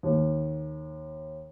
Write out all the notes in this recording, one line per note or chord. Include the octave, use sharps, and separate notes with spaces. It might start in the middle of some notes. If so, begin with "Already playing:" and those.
D#2